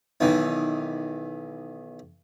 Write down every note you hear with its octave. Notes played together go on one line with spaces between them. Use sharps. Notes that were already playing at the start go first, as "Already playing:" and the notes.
B1 D#3 E3